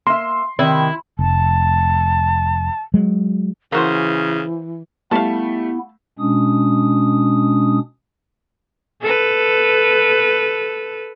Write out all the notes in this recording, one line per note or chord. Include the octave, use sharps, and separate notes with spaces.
A#3 E5 C6
C3 D#3 E4
F1 A5
F#3 G#3
C#3 E3 A#3 F#4 C5
G3 A3 B3 E4 F5 A5
B2 G#3 C#4 D4 D#6
A4 B4